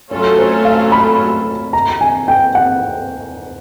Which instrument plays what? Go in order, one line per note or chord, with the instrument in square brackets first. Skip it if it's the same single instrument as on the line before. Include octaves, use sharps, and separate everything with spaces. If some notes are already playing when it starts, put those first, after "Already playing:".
[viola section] F#3 A3 C#4 F4 A4 [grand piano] C#5
[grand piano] C5
F5
B5
A#5
G#5
G5
F#5